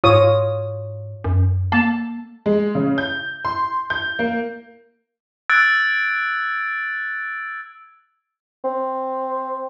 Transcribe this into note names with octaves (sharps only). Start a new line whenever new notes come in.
G#2 F4 C#5 D#6
F#2
A#3 A5
G#3
C#3
G6
C6
G6
A#3
E6 F#6 G#6 A6 D7
C4